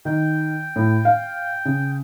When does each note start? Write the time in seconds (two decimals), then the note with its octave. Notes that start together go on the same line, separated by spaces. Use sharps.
0.05 D#3 G5
0.76 A2
1.05 F5
1.65 C#3